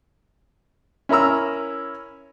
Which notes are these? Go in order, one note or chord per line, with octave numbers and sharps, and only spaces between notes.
C#4 E4 A#4 A#5 E6